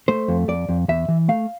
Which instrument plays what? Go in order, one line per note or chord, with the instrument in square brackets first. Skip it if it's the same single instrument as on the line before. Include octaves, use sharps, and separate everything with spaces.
[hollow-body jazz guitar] A3 C5
F2
F2 D5
F2
E2 E5
E3
A3 F5